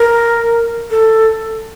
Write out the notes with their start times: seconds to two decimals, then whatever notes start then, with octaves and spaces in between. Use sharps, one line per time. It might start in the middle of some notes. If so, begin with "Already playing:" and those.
Already playing: A#4
0.91 A4